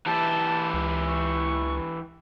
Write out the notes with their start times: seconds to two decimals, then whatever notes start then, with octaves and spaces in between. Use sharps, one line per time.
0.07 E3 G4 A5
0.74 C#2
1.08 C#6